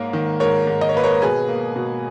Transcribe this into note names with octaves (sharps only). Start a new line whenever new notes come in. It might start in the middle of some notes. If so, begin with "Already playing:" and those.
Already playing: G#2 A#3 A#4 C#5
D#3
G#2 A#4 C#5
G#2
D#5
C#5
A#3 B4
A#4 C#5
B2 G#4 B4
A#3
B2